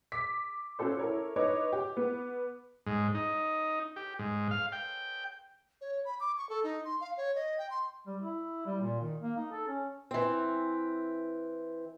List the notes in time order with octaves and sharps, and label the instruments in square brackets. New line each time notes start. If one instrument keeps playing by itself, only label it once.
[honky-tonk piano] D6 B6
C#4 F4 F#4 A4 C5
E4 A4 A#4 C#5
D#4 B4 C#5 D#5 D6
G4
B3
[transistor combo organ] G#2
D#4
G4
G#2
F5
G5
[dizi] C#5
B5
D6
C#6
A4
D#4
C6
F5
C#5
D#5
G5
C6
[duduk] G3
E4
G3
A#2
D#3
A#3
D#4
A4
C#4
[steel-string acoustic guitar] E3 C4